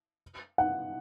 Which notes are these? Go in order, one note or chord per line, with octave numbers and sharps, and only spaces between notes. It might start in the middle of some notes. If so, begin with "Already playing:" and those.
F#5